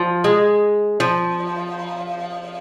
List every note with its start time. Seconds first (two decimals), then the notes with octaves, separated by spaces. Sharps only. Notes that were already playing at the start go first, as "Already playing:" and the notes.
Already playing: F3
0.24 G#3
1.00 F3